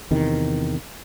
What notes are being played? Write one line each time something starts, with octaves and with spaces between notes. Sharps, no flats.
E2 C3 D#3